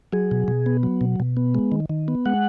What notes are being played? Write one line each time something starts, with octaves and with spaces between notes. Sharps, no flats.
F#3 G#4
B2
B2
B3
F#3
B2
B2
B3
G#3
D#3
D#3
B3
G#3 F#5